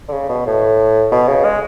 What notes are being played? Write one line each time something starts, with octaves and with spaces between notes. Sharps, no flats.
D3
C#3
B2
A2
B2
C#3
G#3